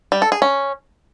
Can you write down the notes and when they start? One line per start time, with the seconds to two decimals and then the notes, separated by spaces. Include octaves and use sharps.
0.12 G3
0.22 A4
0.32 G#4
0.42 C#4